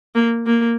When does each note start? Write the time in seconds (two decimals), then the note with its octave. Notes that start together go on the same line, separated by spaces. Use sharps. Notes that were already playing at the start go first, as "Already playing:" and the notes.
0.15 A#3
0.46 A#3